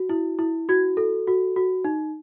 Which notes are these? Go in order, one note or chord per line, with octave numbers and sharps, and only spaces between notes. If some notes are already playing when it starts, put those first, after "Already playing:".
Already playing: F#4
E4
E4
F#4 G#6
A4
F#4
F#4
D#4